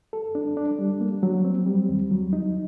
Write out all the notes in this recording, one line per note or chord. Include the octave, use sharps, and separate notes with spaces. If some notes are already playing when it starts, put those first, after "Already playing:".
A4
D4
D4
G3
A#3
F#3
C4
G3
D#2
F#3
D#4